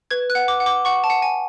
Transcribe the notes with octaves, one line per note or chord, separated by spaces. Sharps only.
B4 G#6
F#6
F#5
D6
F#5
D6
F#5 C#6
A5
F#5
G#5